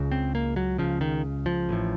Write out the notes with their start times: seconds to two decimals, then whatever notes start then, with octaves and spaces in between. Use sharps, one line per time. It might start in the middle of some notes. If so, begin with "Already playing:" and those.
Already playing: C#2 C#3
0.11 C4
0.35 A#3
0.56 F#3
0.78 C#2 C#3 F3
1.01 D#3
1.46 F3
1.69 A1 A2